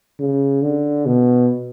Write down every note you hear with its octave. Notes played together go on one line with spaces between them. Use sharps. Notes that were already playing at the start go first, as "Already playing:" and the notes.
C#3
D3
B2